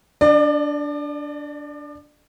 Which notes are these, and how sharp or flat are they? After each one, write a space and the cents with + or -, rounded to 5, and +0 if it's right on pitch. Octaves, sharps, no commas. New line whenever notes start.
D4 -10 D5 +35